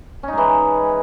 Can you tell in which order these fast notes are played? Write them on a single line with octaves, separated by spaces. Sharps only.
C#4 D#4 G#3 E3